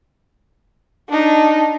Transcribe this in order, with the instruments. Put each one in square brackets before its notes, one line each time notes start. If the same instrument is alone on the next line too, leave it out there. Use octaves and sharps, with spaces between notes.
[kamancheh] D4 D#4